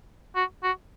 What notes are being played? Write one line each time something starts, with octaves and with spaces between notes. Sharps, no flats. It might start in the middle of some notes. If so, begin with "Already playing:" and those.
F#4
F#4